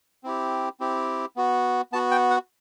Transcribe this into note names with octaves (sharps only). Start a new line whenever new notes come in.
C4 E4 G4
C4 E4 G4
B3 F#4
B3 F#4 A5
G5
F#5